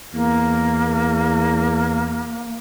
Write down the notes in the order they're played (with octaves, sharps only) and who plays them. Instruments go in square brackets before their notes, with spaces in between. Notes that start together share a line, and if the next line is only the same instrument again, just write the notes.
[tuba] E2 [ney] A#3